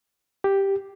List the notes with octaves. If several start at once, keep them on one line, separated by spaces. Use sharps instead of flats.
G4